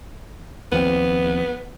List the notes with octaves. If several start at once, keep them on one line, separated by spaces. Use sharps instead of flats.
D#2 F3 B3 C4